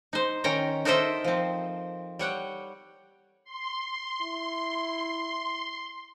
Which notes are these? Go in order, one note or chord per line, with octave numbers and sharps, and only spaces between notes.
D#4 C5
D#3 C#4 C#5 G5 G#5 A#5
D#4 A4 A#4 C5 D#5 E5
F3 C4
G3 C#5 F#5 G5
C6
E4